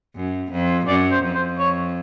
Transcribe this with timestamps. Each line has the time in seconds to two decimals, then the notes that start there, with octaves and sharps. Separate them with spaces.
0.16 F#2
0.51 F2
0.87 F#2 D5
1.12 C5
1.23 F2
1.35 C5
1.59 C#5